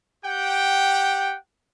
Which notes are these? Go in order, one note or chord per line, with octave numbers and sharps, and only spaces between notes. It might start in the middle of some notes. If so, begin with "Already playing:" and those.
G4 F#5 G5